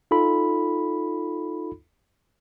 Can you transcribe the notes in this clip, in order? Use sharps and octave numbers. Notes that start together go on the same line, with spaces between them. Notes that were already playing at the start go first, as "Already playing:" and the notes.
D#4 F4 A4 B5